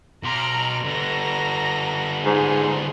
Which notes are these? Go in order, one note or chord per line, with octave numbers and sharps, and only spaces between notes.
B2 A#5 C6 F6 D7
D3 B3 A#5 A#6
G#2 G#4 C6